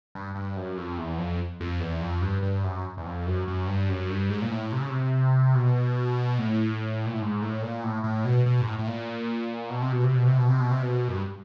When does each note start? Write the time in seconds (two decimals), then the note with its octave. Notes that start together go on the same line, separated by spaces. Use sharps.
0.15 G2
0.35 G2
0.56 F#2
0.78 F2
0.98 E2
1.18 F2
1.60 F2
1.80 E2
2.01 F2
2.22 G2
2.43 G2
2.64 F#2
2.97 E2
3.06 F2
3.27 F#2
3.48 F#2
3.67 G2
3.89 F#2
4.10 G2
4.30 G#2
4.42 A#2
4.51 A2
4.72 C3
4.81 C#3
4.90 C3
5.55 B2
6.39 A2
7.06 A#2
7.13 A2
7.22 G#2
7.42 A2
7.62 A#2
7.84 A2
8.04 A2
8.25 B2
8.46 B2
8.61 G#2
8.67 A2
8.79 A2
8.87 A#2
9.70 B2
9.82 C3
9.92 B2
10.04 C3
10.15 B2
10.27 C3
10.38 B2
10.48 C3
10.60 B2
10.71 C3
10.82 B2
11.09 F#2
11.15 G2